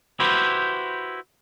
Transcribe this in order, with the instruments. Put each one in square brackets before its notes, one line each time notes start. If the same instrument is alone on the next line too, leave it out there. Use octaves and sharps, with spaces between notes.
[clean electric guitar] E4 F#4 G4 B4 C5